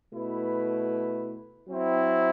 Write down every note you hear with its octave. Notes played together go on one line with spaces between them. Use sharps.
B2 A3 E4 B4
F#3 C4 E4